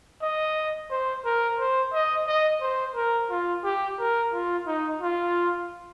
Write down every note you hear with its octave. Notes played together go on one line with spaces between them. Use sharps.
D#5
C5
A#4
C5
D#5
D#5
C5
A#4
F4
G4
A#4
F4
D#4
F4